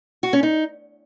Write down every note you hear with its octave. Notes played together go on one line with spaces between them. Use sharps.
F#4
C#4
D#4